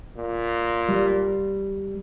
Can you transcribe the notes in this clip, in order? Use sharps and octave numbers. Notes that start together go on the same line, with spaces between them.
A#2
G3